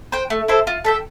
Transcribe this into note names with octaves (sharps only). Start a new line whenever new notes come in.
C5 G5
A3
E4 A4 C5
F4
A4 E5 G5